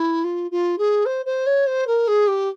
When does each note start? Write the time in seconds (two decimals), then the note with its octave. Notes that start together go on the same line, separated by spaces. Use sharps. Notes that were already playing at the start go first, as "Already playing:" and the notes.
Already playing: E4
0.24 F4
0.51 F4
0.78 G#4
1.05 C5
1.25 C5
1.46 C#5
1.66 C5
1.87 A#4
2.07 G#4
2.27 G4